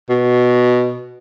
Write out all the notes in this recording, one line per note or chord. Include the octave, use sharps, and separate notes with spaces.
B2